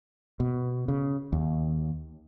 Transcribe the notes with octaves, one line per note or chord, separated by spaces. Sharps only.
B2
C#3
D#2